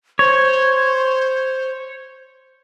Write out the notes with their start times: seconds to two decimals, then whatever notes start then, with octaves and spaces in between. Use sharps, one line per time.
0.19 C5 C#5